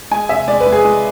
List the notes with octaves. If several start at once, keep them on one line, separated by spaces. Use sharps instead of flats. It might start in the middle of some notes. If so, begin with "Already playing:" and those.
G#3 G#5
C3 E5
G#3 D5
B4
G#3
G#4
G#3